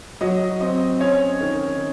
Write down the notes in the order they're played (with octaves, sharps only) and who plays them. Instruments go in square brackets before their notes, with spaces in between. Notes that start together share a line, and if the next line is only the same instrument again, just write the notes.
[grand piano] F#3 [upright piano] D#5
[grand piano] C4 [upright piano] D#5
[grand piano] C#4 [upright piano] C#5
[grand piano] D#3